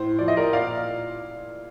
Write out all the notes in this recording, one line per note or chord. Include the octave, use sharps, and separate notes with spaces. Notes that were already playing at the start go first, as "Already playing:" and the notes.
Already playing: A2 C5
F3 D5
D#5
A#4 D5
A#2 D5 F5